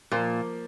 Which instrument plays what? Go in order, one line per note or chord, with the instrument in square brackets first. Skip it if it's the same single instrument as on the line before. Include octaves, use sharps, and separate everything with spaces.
[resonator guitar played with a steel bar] A#2 [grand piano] F3 A#3